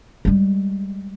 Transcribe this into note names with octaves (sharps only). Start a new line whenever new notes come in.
G3 G#3